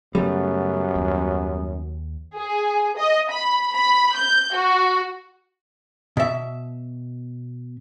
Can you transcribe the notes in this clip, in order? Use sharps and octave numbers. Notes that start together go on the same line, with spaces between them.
F#2 C#3 G3 A3 B3
D#2
G#4
D#5
B5
B5
G6
F#4
B2 E5